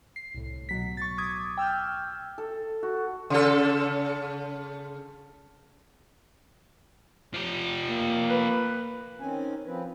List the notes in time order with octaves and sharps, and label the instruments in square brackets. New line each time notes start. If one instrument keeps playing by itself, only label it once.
[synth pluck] C7
C2 A2
B2 F#3 B6
C#6 A6
D6 D#6 G#6
G5 E6 F6 G6
[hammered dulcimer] A4
F#4
[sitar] C#3 A4
[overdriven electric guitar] F3 G4
[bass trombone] A#3
[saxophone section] B4
[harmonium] D#3 C4 C#4 G#5
F3 C4 B4